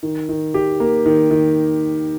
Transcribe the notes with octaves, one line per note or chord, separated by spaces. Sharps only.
D#3
D#3
G4
A#3
D#3
D#3